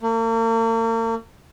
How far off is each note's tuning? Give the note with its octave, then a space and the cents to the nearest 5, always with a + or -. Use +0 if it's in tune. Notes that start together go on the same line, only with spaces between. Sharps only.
A#3 -40